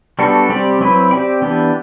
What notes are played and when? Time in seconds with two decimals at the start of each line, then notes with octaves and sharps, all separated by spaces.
0.19 G3 B3 D4 F#4 A4
0.50 G3 C4 G4 D5
0.80 F#3 C4 E4 B4
1.11 C4 G4 D5
1.42 E3 B3 D4 G4